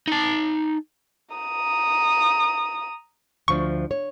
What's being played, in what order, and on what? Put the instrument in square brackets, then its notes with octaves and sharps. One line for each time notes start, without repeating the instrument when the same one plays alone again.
[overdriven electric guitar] D#4 A5
[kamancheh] A#5 D#6
[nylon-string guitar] D2 F3 D4 [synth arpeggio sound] C#6
[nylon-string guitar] C#5